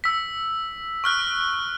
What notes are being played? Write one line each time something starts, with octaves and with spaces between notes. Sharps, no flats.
E6 B6
C#6 F6 F#6